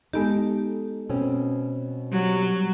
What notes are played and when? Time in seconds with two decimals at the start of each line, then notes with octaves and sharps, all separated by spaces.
0.13 G#3 B3 D#4 G4 A4
1.09 B2 C4 C#4
2.12 F#3 G3